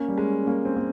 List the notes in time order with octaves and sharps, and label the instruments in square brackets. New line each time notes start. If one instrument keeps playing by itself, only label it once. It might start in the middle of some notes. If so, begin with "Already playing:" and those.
Already playing: [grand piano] A#3 [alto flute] C#4
[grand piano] G3
G#3
A#3
C4
A#3